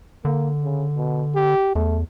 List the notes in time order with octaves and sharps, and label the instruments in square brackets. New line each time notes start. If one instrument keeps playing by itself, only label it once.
[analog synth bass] D3 [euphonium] A#3
[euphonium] C#3
B2
G4
[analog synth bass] E2 [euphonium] A3